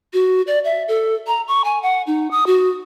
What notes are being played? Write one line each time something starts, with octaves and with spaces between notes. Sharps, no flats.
F#4
D5
E5
A4
A#5
C#6
G#5
F#5
D#4
D#6
F#4